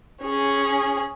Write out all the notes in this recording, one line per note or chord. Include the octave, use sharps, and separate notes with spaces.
C#4 G#4